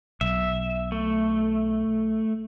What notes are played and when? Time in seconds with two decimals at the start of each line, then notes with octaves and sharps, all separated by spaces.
0.21 B1 E5
0.92 A3